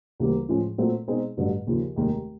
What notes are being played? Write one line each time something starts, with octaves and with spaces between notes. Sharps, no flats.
D2 C#3 E3 G3 A#3
A2 F3 G#3 C#4
A#2 F#3 A3 C4
B2 G#3 C4 D#4 G#4
A1 G2 D3 F#3
D#2 C#3 F3
F1 D#2 D#3 G#3